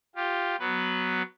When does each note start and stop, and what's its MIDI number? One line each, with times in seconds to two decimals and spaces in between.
0.16 0.56 65
0.16 0.56 67
0.60 1.22 54
0.60 1.22 59
0.60 1.22 71